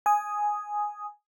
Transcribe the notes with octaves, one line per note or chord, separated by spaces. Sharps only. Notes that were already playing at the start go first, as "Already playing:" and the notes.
G#5 D#6